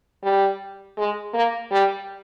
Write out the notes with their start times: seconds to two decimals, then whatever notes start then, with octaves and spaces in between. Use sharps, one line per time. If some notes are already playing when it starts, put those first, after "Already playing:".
0.23 G3
0.98 G#3
1.34 A#3
1.71 G3